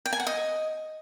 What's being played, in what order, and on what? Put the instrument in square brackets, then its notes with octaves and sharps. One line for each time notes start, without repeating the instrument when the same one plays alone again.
[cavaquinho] G5
G#5
F#5
D#5